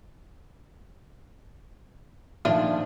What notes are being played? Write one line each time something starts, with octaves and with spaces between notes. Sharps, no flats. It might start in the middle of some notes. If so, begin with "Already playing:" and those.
A#2 D#3 F3 A3 D4 F4